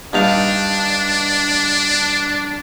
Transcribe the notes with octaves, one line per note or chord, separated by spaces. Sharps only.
G2 D4 D#4 F5